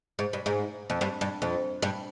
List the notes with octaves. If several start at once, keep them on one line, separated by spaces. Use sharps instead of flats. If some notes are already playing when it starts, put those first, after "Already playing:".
G#2
G2
G#2
F2
G2
G2
F2
G2